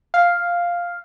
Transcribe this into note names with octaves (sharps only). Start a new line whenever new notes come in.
F5